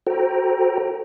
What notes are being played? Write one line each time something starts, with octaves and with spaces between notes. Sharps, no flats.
F#4 A4 C5 G5 A#5